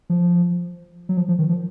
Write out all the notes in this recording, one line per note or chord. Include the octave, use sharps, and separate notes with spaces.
F3
F#3
F3
F3
D#3
F3